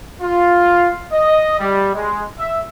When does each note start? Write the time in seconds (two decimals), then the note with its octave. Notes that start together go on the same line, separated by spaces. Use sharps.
0.22 F4
1.13 D#5
1.60 G3
1.94 G#3
2.39 E5